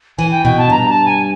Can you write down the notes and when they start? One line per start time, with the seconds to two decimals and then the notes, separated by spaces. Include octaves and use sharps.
0.17 E3 G#5
0.31 G5
0.44 B2 G5
0.57 A5
0.70 G2 A#5
0.88 A5
1.05 G#5